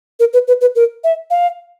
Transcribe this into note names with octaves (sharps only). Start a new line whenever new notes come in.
A#4
B4
B4
B4
A#4
E5
F5